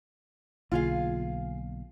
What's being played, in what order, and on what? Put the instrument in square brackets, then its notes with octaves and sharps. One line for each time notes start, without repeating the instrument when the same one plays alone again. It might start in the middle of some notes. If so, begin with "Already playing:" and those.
[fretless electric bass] B1 D3 A#3 [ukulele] F4 G#4 F5